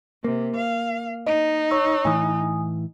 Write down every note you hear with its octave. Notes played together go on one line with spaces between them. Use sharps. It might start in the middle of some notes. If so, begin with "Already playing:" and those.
C3 A#3
F5
D#4 D#5
C#5 C#6 E6
A2 E3 G#5 D#6